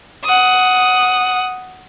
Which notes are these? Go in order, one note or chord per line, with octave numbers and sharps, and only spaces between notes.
F#5 D#6